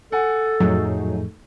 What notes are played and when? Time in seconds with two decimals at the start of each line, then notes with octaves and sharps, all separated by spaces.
0.12 A4 F#5 G#5
0.60 F2 A2 F3 F#3 A3 D#4 G#4